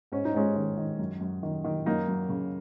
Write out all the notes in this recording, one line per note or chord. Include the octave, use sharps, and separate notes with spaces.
G#2 C#4
D#4
G#2 G#3 C#4
D#3
D#3
F#2
F#2
D#3
D#3
F#2 A#3 D#4
F#2
C#3